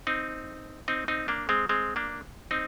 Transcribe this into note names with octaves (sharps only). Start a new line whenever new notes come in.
C4 D#4
C4 D#4
C4 D#4
A#3 D4
G#3 C4
G#3 C4
A#3 D4
C4 D#4